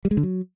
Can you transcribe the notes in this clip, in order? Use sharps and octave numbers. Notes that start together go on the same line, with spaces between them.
G3
G#3
D3
F#3